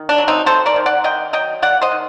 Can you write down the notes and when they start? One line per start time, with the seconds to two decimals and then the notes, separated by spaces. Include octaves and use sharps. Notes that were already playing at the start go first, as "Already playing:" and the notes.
Already playing: D#3
0.09 D4
0.18 F#3
0.28 C4 D#4
0.46 C4 A4 C5
0.66 A#4 D5
0.76 D#3
0.86 D5 F#5
1.04 D#3 D#5 G5
1.33 F#3 D#5 G5
1.62 A#3 D5 F#5
1.81 C5 D#5
1.91 D#3